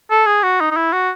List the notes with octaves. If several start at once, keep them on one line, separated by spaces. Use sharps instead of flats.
A4
G#4
F#4
D#4
D#4
E4
F#4